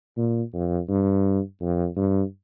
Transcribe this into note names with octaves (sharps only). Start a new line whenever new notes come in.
A#2
F2
G2
F2
G2